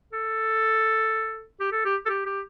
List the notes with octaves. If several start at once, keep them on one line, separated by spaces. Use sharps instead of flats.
A4
G4
A4
G4
A4
G4
G4